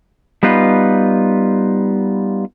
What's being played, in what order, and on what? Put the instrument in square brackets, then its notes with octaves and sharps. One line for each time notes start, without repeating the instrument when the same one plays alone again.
[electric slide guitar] G3 B3 D#4 F4 B4